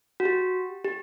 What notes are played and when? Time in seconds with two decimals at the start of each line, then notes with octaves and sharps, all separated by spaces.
0.20 F#4
0.25 G4
0.85 G4